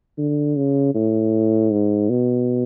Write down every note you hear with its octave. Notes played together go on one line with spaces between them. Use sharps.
D3
C#3
A2
G#2
B2